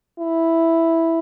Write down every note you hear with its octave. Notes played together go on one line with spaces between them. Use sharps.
E4